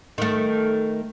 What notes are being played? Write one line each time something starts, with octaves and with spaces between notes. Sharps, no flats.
D#3 A3